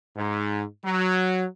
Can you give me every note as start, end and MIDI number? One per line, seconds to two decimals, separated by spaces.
0.16 0.63 44
0.84 1.45 54